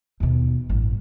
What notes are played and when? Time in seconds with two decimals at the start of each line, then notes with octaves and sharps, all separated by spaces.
0.20 D#2 B2
0.69 A1 G2